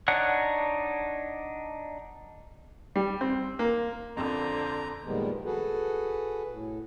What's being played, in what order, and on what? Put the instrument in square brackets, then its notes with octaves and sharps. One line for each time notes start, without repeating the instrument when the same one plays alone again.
[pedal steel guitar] D4 D#4 C#5 F#5 F#6
[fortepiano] G3
C4
A#3
[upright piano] F2 [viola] D3 [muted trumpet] C5 [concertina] A#5
[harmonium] A#2 D#3 F3 G3 G#3 B3
F#4 G#4 A4 B4
A2